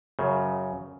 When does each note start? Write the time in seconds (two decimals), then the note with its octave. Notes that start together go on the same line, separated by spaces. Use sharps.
0.19 F#2 C#3